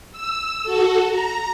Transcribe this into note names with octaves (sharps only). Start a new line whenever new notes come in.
E6
F#4 A4
A#5